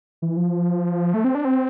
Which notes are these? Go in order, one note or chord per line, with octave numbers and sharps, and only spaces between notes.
E3
F3
A3
C4
D4
C4